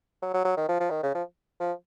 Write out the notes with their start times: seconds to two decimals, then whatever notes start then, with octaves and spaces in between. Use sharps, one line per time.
0.22 F#3
0.34 F#3
0.45 F#3
0.57 D#3
0.69 F3
0.80 F3
0.91 D#3
1.03 C#3
1.15 F3
1.60 F3